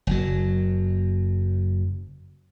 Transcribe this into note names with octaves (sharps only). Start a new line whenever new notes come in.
F#1 F#3